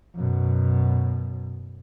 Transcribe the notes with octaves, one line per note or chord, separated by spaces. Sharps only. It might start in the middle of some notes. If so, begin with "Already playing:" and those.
F#2 B2